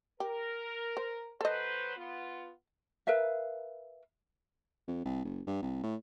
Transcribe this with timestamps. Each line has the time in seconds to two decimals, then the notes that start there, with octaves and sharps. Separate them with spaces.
0.20 G4 A#4
0.97 C5
1.41 F#3 A4 B4 C5 D#5
1.96 B3 F4
3.07 A#4 B4 E5 F5
4.88 F2
5.05 C2
5.25 F#1
5.47 G2
5.62 C2
5.84 A2